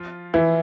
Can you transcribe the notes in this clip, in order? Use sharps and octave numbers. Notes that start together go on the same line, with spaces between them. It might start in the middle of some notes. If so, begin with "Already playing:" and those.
Already playing: F3 F4
E3 E4